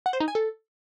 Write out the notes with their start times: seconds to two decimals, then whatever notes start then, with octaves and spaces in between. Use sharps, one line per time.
0.06 F#5
0.13 C5
0.20 D#4
0.28 G#5
0.35 A4